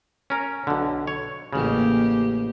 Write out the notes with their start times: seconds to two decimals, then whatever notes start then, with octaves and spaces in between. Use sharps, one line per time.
0.30 C#4 A#4
0.67 B1 D3
1.07 C#5
1.53 A1 C#3 A#3 G4